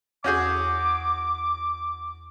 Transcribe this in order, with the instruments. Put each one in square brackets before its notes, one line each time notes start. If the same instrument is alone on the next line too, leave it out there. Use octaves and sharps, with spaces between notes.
[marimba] E2 G6 [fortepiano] C#4 F#4 G#4 [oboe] D6